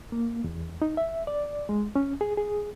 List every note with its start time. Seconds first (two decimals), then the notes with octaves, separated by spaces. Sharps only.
0.12 A#3
0.44 E2
0.82 D#4
0.97 E5
1.27 D5
1.69 G#3
1.96 C#4
2.21 G#4
2.37 G#4